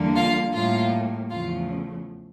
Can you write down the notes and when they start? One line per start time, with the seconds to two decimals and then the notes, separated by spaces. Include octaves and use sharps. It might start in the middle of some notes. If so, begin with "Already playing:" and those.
Already playing: E2 D3 G3 A#3
0.15 F4 F5
0.53 A2 G3 A#3 F4 F5
1.30 E2 C#3 F3 A3 F4 F5